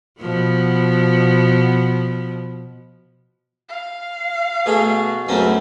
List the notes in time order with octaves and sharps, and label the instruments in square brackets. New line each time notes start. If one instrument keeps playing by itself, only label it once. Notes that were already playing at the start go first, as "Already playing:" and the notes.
[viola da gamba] B2 F3 B3
[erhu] F5
[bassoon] B2 [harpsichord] A3 G#4 A4
[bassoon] C#2 [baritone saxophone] F#2 [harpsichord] A3 C4 C#4